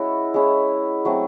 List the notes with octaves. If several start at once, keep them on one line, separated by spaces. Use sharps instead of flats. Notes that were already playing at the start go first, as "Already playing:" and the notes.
Already playing: G#3 C#4 E4 F#4
G#3 C#4 E4
F#3 A3 C4